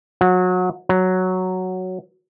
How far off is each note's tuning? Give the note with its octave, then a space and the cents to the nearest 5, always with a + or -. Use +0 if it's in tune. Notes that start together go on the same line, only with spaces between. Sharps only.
F#3 -25
F#3 +0